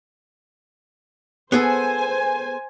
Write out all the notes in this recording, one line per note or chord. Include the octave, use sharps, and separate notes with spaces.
B3 G#4 A4 C5 G#5